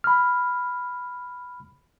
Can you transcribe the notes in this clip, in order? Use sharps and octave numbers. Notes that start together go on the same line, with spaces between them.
B5 F6